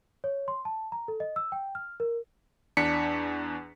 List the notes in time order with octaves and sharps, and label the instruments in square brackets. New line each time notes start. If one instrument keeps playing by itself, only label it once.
[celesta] C#5
C6
A5
A#5
A4
D#5
E6
G5
F6
A#4
[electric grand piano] E2 D4 B6 C#7